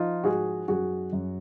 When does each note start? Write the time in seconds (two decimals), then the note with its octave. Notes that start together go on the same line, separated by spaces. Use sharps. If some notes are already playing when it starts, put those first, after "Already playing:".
Already playing: F3 D#4 F4
0.24 G#2 F#4 G#4
0.68 F#2 F#4 G#4
1.12 F#2